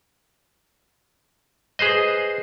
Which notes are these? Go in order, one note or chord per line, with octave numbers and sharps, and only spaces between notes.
G#4 B4 C5 D#5